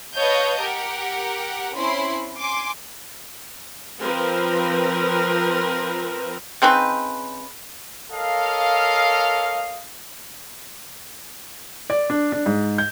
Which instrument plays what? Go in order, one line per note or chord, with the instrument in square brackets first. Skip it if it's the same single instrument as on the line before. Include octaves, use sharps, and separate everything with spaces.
[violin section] B4 C#5 D#5 F5 A5 G6
G4 A#4 F#5
C4 C#4 E4 B5 C6
G#5 C6 D6
[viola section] F3 C4 A#4 B4
[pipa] C#3 C4 D#4 B4
[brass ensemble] A4 A#4 C#5 D#5 F5
[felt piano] D5
D4
D4
G#2
G6